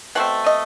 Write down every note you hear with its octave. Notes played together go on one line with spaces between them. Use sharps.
B2 A3 C4 F#5
D#5